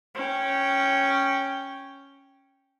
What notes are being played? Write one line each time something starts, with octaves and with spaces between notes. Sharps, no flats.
C#4 G5